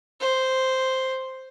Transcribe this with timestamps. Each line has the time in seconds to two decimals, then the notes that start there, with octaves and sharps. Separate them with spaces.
0.20 C5